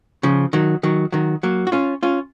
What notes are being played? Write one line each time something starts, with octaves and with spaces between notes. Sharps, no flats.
C#3 F3
D#3 F#3
D#3 F#3
D#3 F#3
F#3 A#3
F#4
C#4 F4
C#4 F4